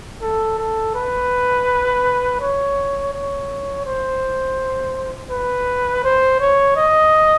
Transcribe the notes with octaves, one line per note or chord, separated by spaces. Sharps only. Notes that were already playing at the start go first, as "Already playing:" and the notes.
A4
A4
B4
C#5
C#5
C5
B4
C5
C#5
D#5